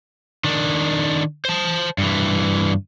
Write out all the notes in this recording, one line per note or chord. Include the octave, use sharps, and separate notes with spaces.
D#3 D4
C5 A5
G2 E3